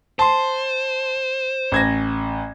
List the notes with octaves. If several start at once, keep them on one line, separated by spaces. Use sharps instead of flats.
C5 A5 C6
A1 G#6 A#6